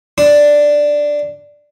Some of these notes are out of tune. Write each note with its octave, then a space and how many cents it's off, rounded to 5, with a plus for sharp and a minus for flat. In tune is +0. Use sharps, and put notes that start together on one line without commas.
D4 +0 C6 -30